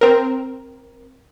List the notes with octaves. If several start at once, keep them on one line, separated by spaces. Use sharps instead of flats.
C4 A#4